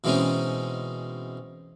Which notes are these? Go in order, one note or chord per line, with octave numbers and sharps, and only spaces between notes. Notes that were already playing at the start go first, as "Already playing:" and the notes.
B2 E3 G#3 C4 C#4 D#4